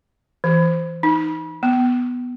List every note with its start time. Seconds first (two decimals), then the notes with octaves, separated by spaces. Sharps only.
0.44 E3
1.03 D#4
1.63 B3